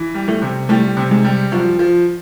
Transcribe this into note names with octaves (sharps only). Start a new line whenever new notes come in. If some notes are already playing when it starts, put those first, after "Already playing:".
Already playing: E3
G3
A2 A3
C3
A2 G3 A3
C3
G#2 G#3
G3
F#2 F3 F#3
F3